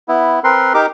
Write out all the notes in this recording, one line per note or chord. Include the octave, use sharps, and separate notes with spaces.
B3 E4
C4 A#4 B4 C6
D#4 G4 A#4 D6